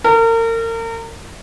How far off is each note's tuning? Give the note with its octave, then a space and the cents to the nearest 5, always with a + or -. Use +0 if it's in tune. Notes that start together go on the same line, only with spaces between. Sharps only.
A#4 -35